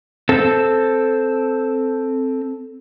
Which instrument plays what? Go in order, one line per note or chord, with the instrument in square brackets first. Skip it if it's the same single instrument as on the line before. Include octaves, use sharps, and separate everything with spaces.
[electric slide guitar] C4 A4